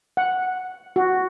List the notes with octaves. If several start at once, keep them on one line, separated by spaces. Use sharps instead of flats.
F#5
F#4